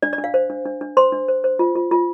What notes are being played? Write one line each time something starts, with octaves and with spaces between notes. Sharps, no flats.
D4 D5
D5
D4
F5
C5
D4
D4
D4
C5 C6
D4
C5
C5
F4
F4
F4